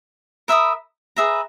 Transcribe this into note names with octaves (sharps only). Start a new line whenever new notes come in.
A#4 E5 B5 D#6
G#4 B4 E5 A#5